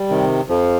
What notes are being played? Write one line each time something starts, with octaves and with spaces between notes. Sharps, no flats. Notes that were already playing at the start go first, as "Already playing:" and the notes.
Already playing: G3
C3 D#3
F2 F3